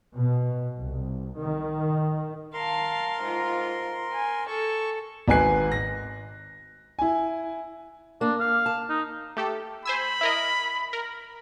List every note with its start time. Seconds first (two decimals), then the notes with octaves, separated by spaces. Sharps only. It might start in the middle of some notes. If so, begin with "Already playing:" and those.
0.14 B2
0.78 C2
1.39 D#3
2.53 A#4 F5 A5 C6
3.21 G#2 F4
4.12 G#5
4.47 A4 C#6
5.28 G#1 G#2 B4 G#5 F#6 C7
5.72 A#6
6.99 E4 G#5
8.21 A#3 D4
8.40 F5
8.66 A5
8.90 D#4
9.37 A3 G4 A4
9.85 C5 G#5 B5 E6
10.21 E4 A#4 D#5
10.93 A#4